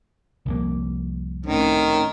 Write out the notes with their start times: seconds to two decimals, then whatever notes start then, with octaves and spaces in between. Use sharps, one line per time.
0.46 C2 F2 A#3
1.46 A2 D#3 C4 C#4